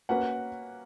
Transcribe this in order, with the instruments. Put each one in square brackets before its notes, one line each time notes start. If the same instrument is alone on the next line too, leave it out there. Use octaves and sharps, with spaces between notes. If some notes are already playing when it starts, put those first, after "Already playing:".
[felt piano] A#3 C#4 F#4 B4 [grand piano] F#5